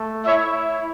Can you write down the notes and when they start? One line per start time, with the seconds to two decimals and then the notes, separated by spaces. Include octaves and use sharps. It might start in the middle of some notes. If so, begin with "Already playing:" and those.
Already playing: A3
0.26 E4 C#5 E5